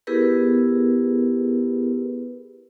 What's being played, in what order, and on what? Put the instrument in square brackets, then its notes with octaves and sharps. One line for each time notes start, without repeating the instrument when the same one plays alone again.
[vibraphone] B3 E4 G4 G#4 A#4 B4